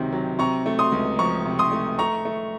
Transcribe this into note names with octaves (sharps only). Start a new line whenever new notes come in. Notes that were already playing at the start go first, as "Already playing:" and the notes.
Already playing: C#2 C3 D#3 F#3
F#3
C3 A#5 C#6
A3
C6 D#6
C#2
F3 A#5 C#6
C3
C6 D#6
A3
A3 A#5 C#6
A3